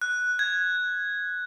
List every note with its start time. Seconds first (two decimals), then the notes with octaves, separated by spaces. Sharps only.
0.02 F#6
0.39 G#6